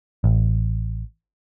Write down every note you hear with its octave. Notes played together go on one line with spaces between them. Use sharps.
A1